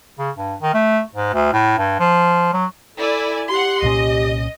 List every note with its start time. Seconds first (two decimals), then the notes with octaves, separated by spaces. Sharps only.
0.19 C#3
0.37 G2
0.61 D#3
0.74 A3
1.15 G#2
1.34 D2
1.53 A2
1.78 G2
1.99 F3
2.53 F#3
2.98 E4 A4 D5 G#5
3.50 G4 F#5 C6
3.82 C2 A#2 C#4 D#5